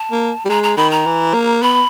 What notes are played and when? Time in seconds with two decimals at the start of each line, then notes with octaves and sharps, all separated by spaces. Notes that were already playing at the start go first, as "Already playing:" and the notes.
Already playing: A5
0.12 A#3
0.45 G3
0.49 G#3 A#5
0.63 A#5
0.77 D#3 B5
0.91 A#5
1.06 E3
1.34 A#3
1.62 B3 B5